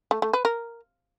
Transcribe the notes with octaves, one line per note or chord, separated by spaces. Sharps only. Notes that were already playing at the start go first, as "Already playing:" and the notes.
A3
A3
B4
A#4